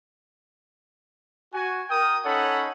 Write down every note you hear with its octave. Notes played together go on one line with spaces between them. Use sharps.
F#4 G#5
A#4 G5 D#6
C#4 D#4 A4 C#5 F#5 B5